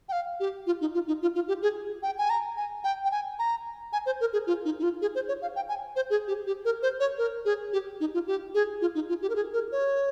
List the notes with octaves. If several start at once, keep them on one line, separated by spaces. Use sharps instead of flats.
G5
F5
G4
F4
D#4
F4
D#4
F4
F4
G4
G#4
G5
G#5
A#5
G#5
G5
G5
G#5
A#5
G#5
C5
A#4
G#4
F4
D#4
D#4
F4
G#4
C5
C#5
F5
G5
G#5
C5
G#4
G4
G4
A#4
C5
C#5
A#4
G#4
G4
D#4
F4
G4
G#4
F4
D#4
F4
G4
A#4
G#4
A#4
C#5